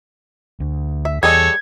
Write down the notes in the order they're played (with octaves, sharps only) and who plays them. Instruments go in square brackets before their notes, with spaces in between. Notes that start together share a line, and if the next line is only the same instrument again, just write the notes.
[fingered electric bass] D2
[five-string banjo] E5
[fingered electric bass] E2 [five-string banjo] G3 G#4 D#5 [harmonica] A4 C#5 [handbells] G#6